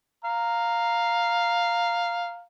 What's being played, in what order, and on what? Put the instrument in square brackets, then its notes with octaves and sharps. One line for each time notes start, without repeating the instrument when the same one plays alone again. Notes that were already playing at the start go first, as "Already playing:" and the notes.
[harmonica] F5 [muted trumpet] A#5